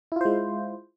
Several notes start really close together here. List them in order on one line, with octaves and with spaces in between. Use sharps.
E4 F4 C5 G#3